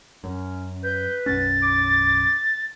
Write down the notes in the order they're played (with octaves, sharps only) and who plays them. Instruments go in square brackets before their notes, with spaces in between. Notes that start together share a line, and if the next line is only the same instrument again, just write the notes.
[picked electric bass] F#2 [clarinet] C#4
[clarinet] B4 [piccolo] G6
[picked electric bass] B1 F#2 C#4 [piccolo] A6
[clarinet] D6